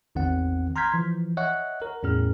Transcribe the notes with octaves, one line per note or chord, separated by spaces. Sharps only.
A1 E2 D#3 C4 F#5
A#5 C6 F6 G6 G#6 B6
E3 F3
C#5 D#5 E5 F#5 C#6 F#6
A#4
E2 A2 C#4 G#4 A#4 F6